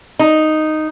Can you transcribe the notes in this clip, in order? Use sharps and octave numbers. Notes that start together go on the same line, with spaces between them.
D#4